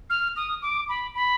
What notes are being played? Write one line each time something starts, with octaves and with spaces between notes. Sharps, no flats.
F6
D#6
D6
B5
B5